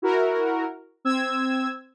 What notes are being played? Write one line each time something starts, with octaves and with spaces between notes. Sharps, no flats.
E4 F#4 A#4
C4 E6 G#6